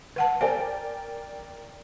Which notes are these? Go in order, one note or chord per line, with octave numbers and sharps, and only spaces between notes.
B4 F#5 A5
A#4 C5 D5 F5 G5 G#5